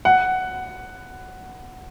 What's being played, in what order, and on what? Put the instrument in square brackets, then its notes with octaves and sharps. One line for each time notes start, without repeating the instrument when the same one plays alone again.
[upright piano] F#5